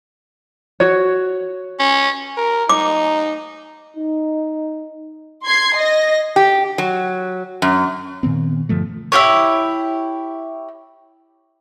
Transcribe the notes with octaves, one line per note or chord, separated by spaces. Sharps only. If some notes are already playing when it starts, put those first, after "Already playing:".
F#4 C#5
C#4
A#4
D#4 D6
D#4
C6 G#6 C7
D#5 A#6
G4
F#3
F#2
A#2 D#3 B3 C4
G2 D3 F3 A3
E4 F4 G4 C#5